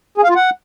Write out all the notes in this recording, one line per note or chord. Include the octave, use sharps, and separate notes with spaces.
G#4
F5
F4
F#5